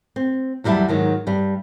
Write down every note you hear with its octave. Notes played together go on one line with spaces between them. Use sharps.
C4
E2 F#3 G3 E4 E5 A5
G#2 D#3 F#3
G2 G3